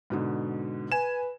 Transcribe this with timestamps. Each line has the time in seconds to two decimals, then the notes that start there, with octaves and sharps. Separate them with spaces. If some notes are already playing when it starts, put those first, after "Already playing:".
0.10 G#2 B2 D3
0.92 B4 G#5 E7